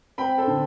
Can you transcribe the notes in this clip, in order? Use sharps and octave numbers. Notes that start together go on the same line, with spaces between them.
C4 G5 B5
A4 C5
D3